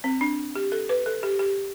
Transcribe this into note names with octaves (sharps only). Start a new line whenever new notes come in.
C4
D4
G4
A4
B4
A4
G4
G4